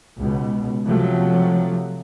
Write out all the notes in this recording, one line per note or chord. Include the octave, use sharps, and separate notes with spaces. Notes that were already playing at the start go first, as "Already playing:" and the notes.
C#2 B2
C3 F3 F#3 A3